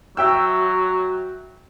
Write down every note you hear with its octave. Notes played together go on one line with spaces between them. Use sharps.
F#3 F#4 E5 G5 E6